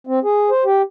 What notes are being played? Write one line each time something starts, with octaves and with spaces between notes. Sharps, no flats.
C4
G#4
C5
G4